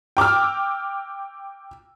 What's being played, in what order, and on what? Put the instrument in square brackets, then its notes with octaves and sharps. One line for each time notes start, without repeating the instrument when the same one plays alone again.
[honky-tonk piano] G5 D6 E6 F6